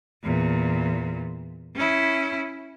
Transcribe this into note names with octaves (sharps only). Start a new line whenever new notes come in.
E2 A#2
C#4 E4